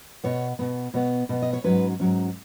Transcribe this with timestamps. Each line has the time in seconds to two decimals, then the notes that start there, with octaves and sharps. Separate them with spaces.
0.24 B2 B3 C#5
0.59 B2 B3
0.94 B2 B3 C#5
1.29 B2 B3
1.42 D#5
1.53 C#5
1.64 G#2 F#3 C#4 B4
2.00 G#2 F#3 C#4